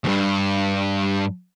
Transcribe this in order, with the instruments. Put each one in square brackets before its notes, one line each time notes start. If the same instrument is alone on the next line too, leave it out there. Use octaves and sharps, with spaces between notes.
[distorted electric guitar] D2 G2